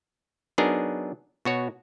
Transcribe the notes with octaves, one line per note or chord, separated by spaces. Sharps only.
F#3 B3 D4 D#4 G#4 A#4
B2 F#4 C#5